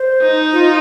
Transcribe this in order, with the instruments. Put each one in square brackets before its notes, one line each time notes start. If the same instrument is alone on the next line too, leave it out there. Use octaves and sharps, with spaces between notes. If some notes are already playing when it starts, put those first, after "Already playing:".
Already playing: [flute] C5
[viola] D#4
[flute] F4